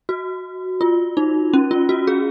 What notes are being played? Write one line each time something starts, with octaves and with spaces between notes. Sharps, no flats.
F#4
F4
D#4
C#4
F4
F#4
G#4